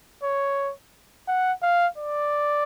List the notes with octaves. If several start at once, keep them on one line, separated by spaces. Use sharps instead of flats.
C#5
F#5
F5
D5